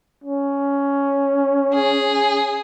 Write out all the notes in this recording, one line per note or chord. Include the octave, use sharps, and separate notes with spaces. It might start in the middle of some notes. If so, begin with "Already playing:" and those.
C#4
G#4